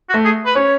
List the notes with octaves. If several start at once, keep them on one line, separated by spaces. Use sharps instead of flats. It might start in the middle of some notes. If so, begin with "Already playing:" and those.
F#4
A3
G#4
B4
C#4 C#5